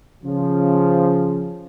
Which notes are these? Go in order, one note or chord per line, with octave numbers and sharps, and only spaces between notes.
C#3 F3